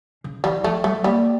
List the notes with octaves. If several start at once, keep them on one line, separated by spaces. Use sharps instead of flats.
C#3
E3 G3
F3 A3
G3 A3
G3 A#3